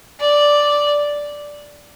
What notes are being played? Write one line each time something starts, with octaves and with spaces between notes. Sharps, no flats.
D5